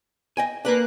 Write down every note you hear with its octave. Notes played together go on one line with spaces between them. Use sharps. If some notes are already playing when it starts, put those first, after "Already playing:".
D#5 G5 G#5
A#3 D4 A#4 B4 F#6